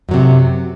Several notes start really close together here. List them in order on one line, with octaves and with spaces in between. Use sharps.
F#2 F#3 C3